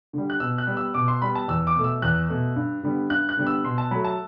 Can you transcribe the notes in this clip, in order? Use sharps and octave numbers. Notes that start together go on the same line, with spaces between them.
D3 G3
F#6
B2 E6
F#6
G3 B3
E6
B2 D6
C6
G3 B3 B5
A5
E2 E6
D6
B2 A3
E6
E2 F#6
B2 A3
G2
D3 G3 B3
G2 F#6
F#6
D3 G3 B3
E6
B2 C6
A5
F#3 A3 B5
A5